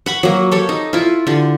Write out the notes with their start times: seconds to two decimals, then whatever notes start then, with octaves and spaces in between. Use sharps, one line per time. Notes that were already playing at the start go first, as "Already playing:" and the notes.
0.06 F#5 B5 C#6
0.23 F#3 A#3
0.52 G4 A4 C#5
0.69 D#4
0.93 E4 F4
1.27 D3 G4